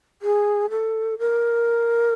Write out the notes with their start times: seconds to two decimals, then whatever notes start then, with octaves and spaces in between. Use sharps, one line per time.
0.22 G#4
0.70 A4
1.19 A#4